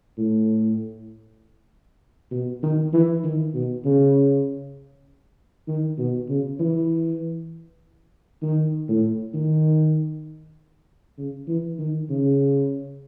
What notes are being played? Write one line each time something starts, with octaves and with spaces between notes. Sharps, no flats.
A2
B2
D#3
E3
D#3
B2
C#3
D#3
B2
C#3
E3
D#3
A2
D#3
C#3
E3
D#3
C#3